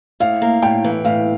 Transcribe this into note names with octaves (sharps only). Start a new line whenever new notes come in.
A2 F5
A#3
A2 G5
E3
A2 F5